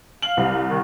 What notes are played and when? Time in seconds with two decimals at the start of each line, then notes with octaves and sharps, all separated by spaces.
0.22 F5 F#7
0.37 C2
0.69 D#3